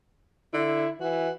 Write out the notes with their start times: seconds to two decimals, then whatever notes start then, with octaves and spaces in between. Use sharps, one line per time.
0.54 D3 E4
1.00 E3 F#4